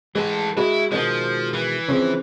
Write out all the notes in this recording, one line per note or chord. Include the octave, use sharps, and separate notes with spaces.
E3 G#3 A4
G#3 E4 F#4
B2 D#3 F3 G#3
E3
C#3 F3 C4